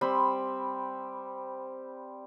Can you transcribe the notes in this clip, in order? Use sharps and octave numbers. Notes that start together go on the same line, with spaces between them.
G3 C4 B5 C6